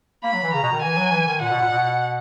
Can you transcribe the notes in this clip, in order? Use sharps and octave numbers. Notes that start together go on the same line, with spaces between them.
A#3 B5
F#3
E3
C#3 A#5
B2
D#3
E3 G#5
F#3
E3
D#3
A#2 F#5
B2
A#2
B2